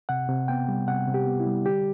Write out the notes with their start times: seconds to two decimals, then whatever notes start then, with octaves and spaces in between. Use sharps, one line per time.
0.09 C3 F#5
0.29 C3
0.48 B3 G5
0.69 G3
0.88 C3 F#5
1.07 C3
1.14 G4
1.26 B3
1.40 E4
1.47 G3
1.65 D3 G4